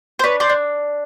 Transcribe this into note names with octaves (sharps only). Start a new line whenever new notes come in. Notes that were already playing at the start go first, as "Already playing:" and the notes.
C5
D4 B4 C#5
C5 D5
D4